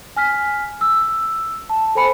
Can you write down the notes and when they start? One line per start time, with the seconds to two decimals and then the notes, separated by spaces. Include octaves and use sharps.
0.16 G#5 F6 B6
0.81 E6
1.69 A5
1.95 A4 C5 G#5 B5 C#7